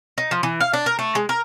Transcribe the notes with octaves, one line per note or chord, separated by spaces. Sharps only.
D#4
F3
E3
F5
D4
A#4
A3
G#3
A#4